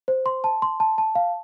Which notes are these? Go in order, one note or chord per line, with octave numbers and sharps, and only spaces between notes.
C5
C6
A5
C6
A5
A5
F5